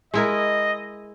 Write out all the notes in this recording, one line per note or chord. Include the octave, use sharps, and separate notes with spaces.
G#3 E4 A#4 D#5